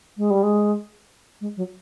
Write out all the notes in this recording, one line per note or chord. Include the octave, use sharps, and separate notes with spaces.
G#3
G3
G#3
G#3
F#3